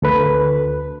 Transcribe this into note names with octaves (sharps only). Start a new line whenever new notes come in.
D2 A4 B4